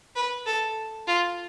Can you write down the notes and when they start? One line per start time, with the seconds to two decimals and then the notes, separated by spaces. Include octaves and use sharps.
0.16 B4
0.46 A4
1.08 F4